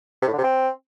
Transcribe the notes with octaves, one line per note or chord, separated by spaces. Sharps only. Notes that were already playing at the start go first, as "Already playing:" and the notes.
C3
A2
D3
C3
C4